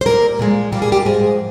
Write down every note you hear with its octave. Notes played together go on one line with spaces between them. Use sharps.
C5
A#2 G3 A#3 A#4
A#2 F3 G#3
A#2 G3 A#3 G4
G#4
G4
G#2 F3 G#3 G#4